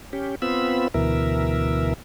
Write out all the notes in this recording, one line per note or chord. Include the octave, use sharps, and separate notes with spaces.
C#4 G4
B3 C4 F4 B5 E6
D2 B2 E3 A#4 E5